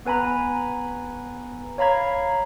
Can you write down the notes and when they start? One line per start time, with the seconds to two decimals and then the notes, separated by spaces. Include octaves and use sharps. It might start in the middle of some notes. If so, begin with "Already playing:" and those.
0.05 B3 B4 G#5 A#5 B5
1.78 C#5 F5 A#5 B5 G#6